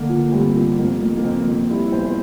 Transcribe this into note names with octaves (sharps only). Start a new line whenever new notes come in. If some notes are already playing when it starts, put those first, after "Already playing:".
Already playing: D3 A#3
F3
G2 C4
F3 A#3
F2 A#3
F2
A#3
F2 C4
F2
G3 E4
E2 C5
C5